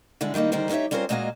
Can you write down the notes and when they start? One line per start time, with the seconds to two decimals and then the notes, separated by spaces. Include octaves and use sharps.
0.21 D3 G3 G#3 D4 E4
0.34 D#3 G3 A3 A#3 D#4
0.52 D3 D#3 G3 G4 A#4 C5
0.69 D#4 G4 A#4 C#5 E5
0.91 G3 C4 C#4 F4 A#4 C5
1.09 A#2 G#3 A#3 F#4 D#5 F5